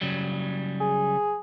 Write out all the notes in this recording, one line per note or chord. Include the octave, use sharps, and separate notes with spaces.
C#3 F#3 G3
G#4